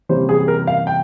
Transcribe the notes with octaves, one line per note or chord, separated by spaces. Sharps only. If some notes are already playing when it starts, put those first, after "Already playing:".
C3 E3 G3 A#3 C#4 C5
G#4
A#4
F5
G5